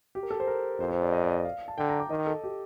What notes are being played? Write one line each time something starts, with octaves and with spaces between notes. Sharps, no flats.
G4
A#4
A4
C5
A#4
F2 C5
C5
D5
D#5
D5
D#5
F5
A5
D3 G5
A#5
D6
D#3 D#5
A4
G4